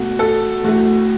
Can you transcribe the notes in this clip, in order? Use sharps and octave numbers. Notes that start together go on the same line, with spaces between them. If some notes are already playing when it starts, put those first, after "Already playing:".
Already playing: B2 A3 F#4
A4
A2 A3 F#4